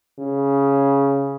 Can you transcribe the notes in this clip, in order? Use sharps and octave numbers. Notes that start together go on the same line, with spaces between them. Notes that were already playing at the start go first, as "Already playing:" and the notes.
C#3